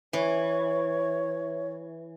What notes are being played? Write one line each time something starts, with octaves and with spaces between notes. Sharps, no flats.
E3 C#5